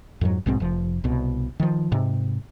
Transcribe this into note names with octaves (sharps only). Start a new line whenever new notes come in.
F2 G#2 F#3
A#1 G#2 B2 C4
F1 F3
C2 B2
D#3 F3
G#2 C3